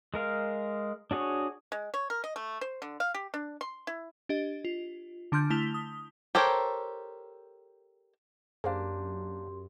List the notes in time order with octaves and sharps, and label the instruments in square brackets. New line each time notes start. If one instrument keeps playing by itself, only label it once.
[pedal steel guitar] G#3 A#4 F5
D4 F#4 G#4 C#5
[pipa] G#3
C#5
A#4
D#5
A3
C5
D3
F5
G4
D4
C6
E4
[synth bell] D4 G4 D#5
F4
D3 D4 C6 F6 G6
A3 E4 A5 B6 F7 G7
D#6
[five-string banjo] G4 A4 A#4 C5 C#5
[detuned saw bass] F#2 [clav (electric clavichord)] A#3 D4 [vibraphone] G4 C6 [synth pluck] G#4 C5 F5